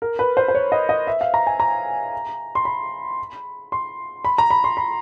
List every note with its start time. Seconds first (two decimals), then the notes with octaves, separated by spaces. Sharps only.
0.02 A#4
0.19 B4
0.37 C5
0.48 C5
0.55 C#5
0.72 D#5
0.89 D#5
1.07 E5
1.21 F5
1.34 A#5
1.47 G#5
1.60 A#5
2.55 C6
2.65 B5
3.72 C6
4.25 B5
4.38 A#5
4.50 B5
4.64 C6
4.77 B5